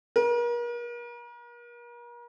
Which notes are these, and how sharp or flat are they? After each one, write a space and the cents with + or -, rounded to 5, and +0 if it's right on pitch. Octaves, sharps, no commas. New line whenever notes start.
A#4 +40